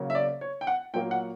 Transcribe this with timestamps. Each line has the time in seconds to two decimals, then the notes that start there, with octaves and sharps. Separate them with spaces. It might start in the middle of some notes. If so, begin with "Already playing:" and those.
Already playing: C#3 F#3 A#3
0.10 E5
0.15 D5
0.41 C#5
0.61 G5
0.67 F#5
0.94 A#2 F#3 A#3 G5
1.11 F#5